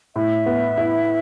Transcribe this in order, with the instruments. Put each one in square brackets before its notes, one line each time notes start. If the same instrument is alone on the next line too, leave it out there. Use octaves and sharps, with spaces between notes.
[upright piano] A2 [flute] E5
[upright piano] B3
E4